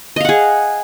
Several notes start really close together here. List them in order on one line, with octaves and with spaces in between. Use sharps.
D#5 F5 F#5 G#4